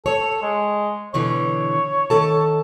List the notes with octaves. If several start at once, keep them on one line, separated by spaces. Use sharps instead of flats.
A4 C#5
G#3
B2 D3 E3 C#5
D#3 A4 A5